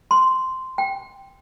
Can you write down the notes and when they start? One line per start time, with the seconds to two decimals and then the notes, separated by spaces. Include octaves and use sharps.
0.11 C6
0.78 G5